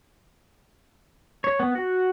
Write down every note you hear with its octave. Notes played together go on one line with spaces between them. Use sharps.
C#5
B3
F#4